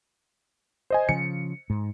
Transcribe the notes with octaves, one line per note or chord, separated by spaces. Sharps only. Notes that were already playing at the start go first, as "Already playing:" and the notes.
C5 D#5 G#5
C#3 F3 C#7
G#2